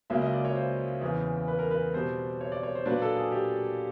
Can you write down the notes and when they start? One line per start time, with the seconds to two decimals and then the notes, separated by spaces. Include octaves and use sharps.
0.10 C#2 C#3 F#3 A#3 E5
0.21 D#5
0.34 D5
0.45 C#5
0.55 C5
1.01 E2 C#3 E3
1.48 B4
1.59 A#4
1.71 B4
1.94 B2 G3 C4 C5
2.41 C#5
2.52 D5
2.63 C#5
2.75 C5
2.86 A#2 F#3 A#3 D4 B4
3.02 A4
3.16 G#4
3.32 G4